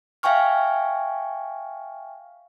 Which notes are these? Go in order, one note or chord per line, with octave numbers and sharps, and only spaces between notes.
E5 F5 G5 G#5 C#6 F6